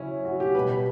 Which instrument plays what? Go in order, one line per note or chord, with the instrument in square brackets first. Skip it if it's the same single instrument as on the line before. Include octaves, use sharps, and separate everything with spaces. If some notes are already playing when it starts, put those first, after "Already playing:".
Already playing: [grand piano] C#3 F#3 C#4 E4
F#4
G4
B2 G3 B4
B4